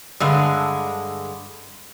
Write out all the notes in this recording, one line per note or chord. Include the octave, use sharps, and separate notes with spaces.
G2 D3 G#3